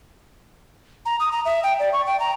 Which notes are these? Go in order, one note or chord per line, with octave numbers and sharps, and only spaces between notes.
A#5
D#6
A#5
E5
G5
D5
C#6
G5
A#5